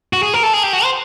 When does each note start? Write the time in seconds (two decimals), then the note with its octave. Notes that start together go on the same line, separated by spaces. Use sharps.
0.13 F#4
0.23 G#4
0.34 A#4
0.43 A4
0.53 G#4
0.63 G4
0.73 F#4
0.84 C5